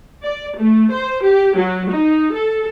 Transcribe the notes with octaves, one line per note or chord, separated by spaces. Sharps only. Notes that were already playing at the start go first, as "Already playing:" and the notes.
D5
A3
C5
G4
F#3
D#4
A4